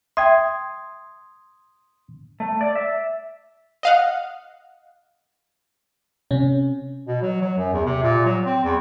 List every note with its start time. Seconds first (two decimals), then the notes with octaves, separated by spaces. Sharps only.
0.17 E5 G5 C6 D#6 G#6
2.40 A3
2.61 D5
2.75 E5
3.83 D#5 F5 F#5
6.31 C3 C#4
7.08 B2
7.22 F#3
7.42 F#3
7.58 F#2
7.74 E2
7.86 C3
8.03 A#2
8.26 F#3
8.46 C4
8.64 E2